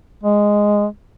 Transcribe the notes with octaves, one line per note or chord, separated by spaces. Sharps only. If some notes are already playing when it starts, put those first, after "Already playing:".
G#3